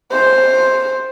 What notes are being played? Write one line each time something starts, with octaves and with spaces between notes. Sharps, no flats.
C5